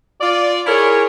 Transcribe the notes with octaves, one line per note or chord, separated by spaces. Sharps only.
F4 D5
E4 G#4 A#4 C#5